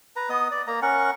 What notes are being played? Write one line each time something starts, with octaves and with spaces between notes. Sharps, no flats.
B4 A#5
B3 D#5 D#6
D5
A#3 A#5
C#4 A#4 F#5 C#6